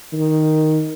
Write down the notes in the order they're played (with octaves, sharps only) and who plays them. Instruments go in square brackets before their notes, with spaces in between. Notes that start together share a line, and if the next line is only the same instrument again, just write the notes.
[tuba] D#3